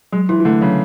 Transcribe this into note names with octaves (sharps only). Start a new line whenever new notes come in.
F#3 G#3
E3 E4
E3
D3 A3
C#3 F#3